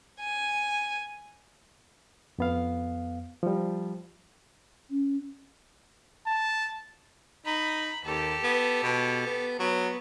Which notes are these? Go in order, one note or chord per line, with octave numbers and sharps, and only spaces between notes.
G#5
F2 B3 F5
F3 G3
C#4
A5
D#4 B5
D#2 G4 A4
B3
B2
B3
F#3 B3